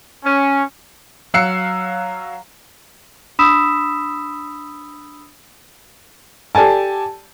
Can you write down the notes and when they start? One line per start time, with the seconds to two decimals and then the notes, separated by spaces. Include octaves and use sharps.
0.23 C#4
1.34 F#3 F5 E6 F#6 C7 C#7
3.39 D4 B5 D#6 E6 B6 E7
6.55 G4 A4 D5 G#5 A5